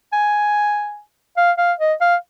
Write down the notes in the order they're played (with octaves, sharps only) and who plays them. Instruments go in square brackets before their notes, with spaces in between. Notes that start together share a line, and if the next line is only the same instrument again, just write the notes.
[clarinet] G#5
F5
F5
D#5
F5